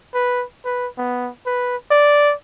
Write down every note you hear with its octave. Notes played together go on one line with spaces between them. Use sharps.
B4
B4
B3
B4
D5